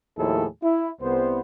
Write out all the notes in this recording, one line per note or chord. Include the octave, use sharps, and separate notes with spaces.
D#2 A2 F3 E4 G#4 A4
E4
C2 B3 C5